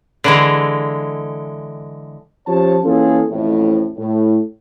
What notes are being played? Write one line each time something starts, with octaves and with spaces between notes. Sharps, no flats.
D3 E3 G#3
F3 C#4 G4 C#5 A5
E3 A#3 C#4 F4 G#4 A4
A1 F2 A2
A2